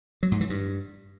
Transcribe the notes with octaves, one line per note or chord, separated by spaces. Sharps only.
F#3
G#2
E3
G2